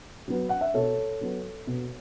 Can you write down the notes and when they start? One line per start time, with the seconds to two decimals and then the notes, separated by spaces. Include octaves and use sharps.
0.28 F#3 B3
0.49 F#5
0.61 E5
0.74 B2 A4 C#5
1.21 F#3 B3
1.67 B2